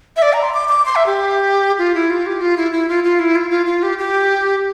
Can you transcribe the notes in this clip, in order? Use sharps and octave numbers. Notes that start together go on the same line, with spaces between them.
E5
D5
A#5
C6
D6
D6
C6
E5
G4
F4
E4
F4
G4
F4
E4
E4
F4
F4
E4
F4
F4
F4
G4
G4